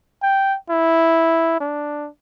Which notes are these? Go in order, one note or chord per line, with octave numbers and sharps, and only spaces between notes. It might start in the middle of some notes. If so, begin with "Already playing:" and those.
G5
E4
D4